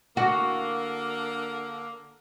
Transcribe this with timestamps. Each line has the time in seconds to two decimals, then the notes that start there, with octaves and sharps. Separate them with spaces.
0.17 D3 A#3 F#4